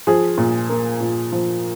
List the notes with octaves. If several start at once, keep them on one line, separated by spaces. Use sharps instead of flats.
F3 G#4
A#2
A#3
A#2
F3